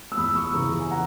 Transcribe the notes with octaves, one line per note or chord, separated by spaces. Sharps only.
E6
E2 B5 D#6
C#6 E6
C#3 E3 A#5 C#6
G#5
F#5 A#5